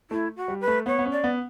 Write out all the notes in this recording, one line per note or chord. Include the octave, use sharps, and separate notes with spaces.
A3 E4
F#4
G3
B4
A3
B3 C#5
B3
C#4
D5
B3